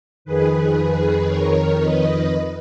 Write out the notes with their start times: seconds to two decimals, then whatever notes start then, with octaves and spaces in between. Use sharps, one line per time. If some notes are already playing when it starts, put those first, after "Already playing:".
0.25 F2 D#3 G#4 B4
1.28 A#4 C#5
1.79 B4 D#5